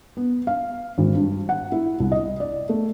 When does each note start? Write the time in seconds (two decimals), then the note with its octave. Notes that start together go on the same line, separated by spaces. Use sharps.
0.17 B3
0.47 F5
0.98 G#1
1.15 G2
1.49 F#5
1.72 E4
2.00 C2
2.12 D#5
2.40 D5
2.69 A3